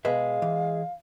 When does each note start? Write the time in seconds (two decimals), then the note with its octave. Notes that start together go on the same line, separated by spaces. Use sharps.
0.05 B2 G#3 B4 E5 F5
0.42 E3